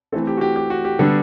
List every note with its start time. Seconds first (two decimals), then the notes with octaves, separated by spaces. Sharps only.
0.12 E3 A3 C4 A4
0.27 G4
0.37 F#4
0.41 G4
0.56 G4
0.70 F#4
0.85 G4
0.99 D3 G3 B3 D4 A4